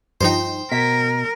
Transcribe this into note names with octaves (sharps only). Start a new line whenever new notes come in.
G2 F3 D#4 C5 G5
B2 A#4 B6